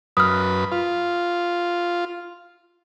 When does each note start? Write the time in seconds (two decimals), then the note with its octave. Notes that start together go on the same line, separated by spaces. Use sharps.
0.17 F#2 B4 D#6 F6
0.72 F4